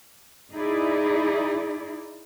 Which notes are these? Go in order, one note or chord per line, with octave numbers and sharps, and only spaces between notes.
D#4 E4 G#4 D5